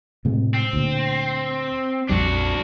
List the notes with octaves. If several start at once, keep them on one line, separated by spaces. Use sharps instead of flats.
A2 C3 G#3
C4
D2 A#2
A#1 F2 G3 D4 F#4